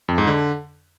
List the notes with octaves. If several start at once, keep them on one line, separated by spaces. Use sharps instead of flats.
F2
G#2
D3